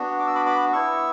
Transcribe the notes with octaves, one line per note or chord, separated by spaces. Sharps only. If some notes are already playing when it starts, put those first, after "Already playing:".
Already playing: B3 D4 F#4
D6
E6
B5 D6
B5 D6
B3 E4 C#6 E6